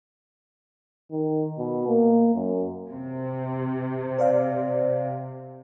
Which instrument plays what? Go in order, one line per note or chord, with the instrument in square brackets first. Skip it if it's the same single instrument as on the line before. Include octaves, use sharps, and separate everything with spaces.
[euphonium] D#3
B2
A#3
F#2
[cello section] C3
[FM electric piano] C5 D5 F5